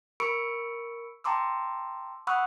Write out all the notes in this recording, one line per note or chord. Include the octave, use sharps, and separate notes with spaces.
A#4 B5 C#6 E6 C#7 D7
G5 A5 A#5 C6 D6 E6
F#5 B5 C#6 D#6 E6 F#6